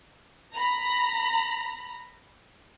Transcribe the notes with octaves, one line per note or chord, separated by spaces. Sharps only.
A#5 B5